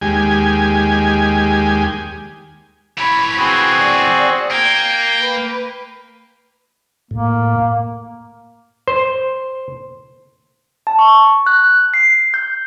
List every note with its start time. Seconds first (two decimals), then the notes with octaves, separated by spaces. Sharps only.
0.01 D#2 G#3 G4 G#5
2.98 E3 C#5 B5
3.37 C4 F#4 G#4
3.79 D5
4.51 A#3 G5 G#6
5.21 B4
7.11 A2 A#3
8.88 C5
10.87 A5
10.99 C#6
11.46 F#6
11.94 C7
12.34 G6